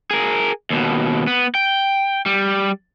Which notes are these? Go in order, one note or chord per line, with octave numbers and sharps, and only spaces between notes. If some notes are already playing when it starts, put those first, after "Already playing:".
G#4 A#4
D#2 B2
B3
G5
G3